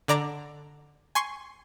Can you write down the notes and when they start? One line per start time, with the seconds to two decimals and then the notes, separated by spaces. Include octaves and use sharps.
0.08 D3 D5 A#5 D6
1.15 G#5 C6 C#6 C7